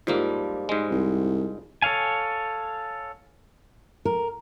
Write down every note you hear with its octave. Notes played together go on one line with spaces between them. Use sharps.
G#2 F3 G3 A#3
G#2 G#3
C2
A4 C#5 F5 G#5
A#4